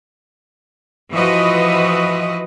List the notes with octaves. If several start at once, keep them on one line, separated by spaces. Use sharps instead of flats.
E3 F3 F#4 B4 D#5